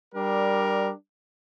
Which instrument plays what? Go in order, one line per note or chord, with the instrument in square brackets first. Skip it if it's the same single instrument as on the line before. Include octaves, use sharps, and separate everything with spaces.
[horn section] G3 D4 A#4